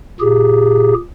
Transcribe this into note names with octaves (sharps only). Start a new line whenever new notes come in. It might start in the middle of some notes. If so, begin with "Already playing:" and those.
A#2 G4 G#4